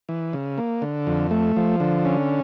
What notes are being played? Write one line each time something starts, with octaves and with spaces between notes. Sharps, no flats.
E3
C#3
A#3
D3
F2
A3
F3
D3
C#4